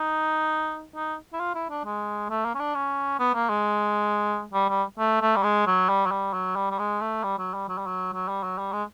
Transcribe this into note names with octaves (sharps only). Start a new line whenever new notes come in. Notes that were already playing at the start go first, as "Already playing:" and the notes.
Already playing: D#4
D#4
E4
F4
E4
D4
G#3
A3
A#3
C#4
D4
C#4
B3
A#3
G#3
G3
G3
A3
A3
G3
G#3
F#3
G3
F#3
G3
F#3
G3
G3
G#3
A3
G3
F#3
G3
F#3
G3
F#3
F#3
G3
F#3
G3
G#3